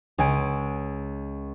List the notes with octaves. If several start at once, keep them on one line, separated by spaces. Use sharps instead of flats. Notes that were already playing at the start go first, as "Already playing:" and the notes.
C#2 G#5 D7